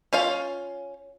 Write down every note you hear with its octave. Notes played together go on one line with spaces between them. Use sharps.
C#4 F4 F5